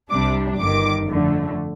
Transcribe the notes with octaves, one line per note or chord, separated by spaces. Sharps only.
C2 C3 G3 D4 D6
G1 G2 D#3 D6
F2 D3 A3